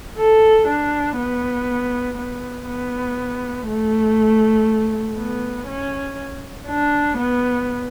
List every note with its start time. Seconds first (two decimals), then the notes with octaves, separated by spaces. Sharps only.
0.18 A4
0.68 D4
1.17 B3
2.17 B3
2.67 B3
3.68 A3
5.17 B3
5.68 C#4
6.68 D4
7.18 B3